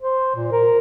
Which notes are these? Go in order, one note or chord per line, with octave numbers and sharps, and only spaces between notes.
C5
A#2
A#4